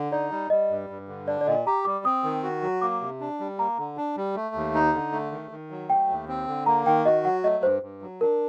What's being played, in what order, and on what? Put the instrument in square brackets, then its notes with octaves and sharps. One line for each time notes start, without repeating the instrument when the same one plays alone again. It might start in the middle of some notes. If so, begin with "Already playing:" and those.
Already playing: [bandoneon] D3
[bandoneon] D#4 [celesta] D5
[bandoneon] G3
[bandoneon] G3 [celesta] D#5
[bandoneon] G2
G2
D3
[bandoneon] D4 [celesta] D5
[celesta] D5
[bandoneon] A#2 [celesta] D#5
[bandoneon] G4 [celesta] A#5
[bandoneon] G3 [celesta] D6
[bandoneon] C4 [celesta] D#6
[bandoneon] D#3
F#4
F#3
[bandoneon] A#3 [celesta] D6
[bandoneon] C3
D4
G3
[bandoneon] A#3 [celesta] A#5
[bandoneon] D3
D4
G3
A3
D#2
D#4
D3
A3
D#3
D#3
F#3
[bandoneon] A3 [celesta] G5
[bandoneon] D#2
C4
D3
[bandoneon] A#3 [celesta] A#5
[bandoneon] D#3 [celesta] G5
[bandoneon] F#4 [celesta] D#5
[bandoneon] F#3 [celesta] F#5
[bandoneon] A3 [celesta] D#5
[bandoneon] G2 [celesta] C5
[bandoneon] G2
F#3
[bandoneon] D4 [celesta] A#4